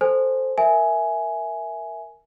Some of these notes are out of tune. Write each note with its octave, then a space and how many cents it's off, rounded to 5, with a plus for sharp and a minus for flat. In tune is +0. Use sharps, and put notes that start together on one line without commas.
A4 +0 C5 +0 G#5 +0
A#4 +0 E5 +0 G#5 +10